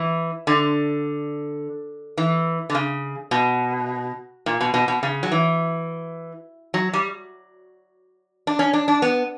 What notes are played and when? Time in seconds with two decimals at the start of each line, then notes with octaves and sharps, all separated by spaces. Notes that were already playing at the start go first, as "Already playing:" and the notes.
Already playing: E3
0.47 D3
2.18 E3
2.70 D3
2.75 C#3
3.31 B2
4.46 A#2
4.61 B2
4.74 B2
4.88 B2
5.03 C#3
5.23 F#3
5.32 E3
6.74 F#3
6.93 G3
8.47 D4
8.59 C#4
8.73 D4
8.88 D4
9.02 B3